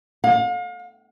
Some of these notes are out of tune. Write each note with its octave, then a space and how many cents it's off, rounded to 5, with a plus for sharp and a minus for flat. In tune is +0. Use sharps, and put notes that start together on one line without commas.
F5 +40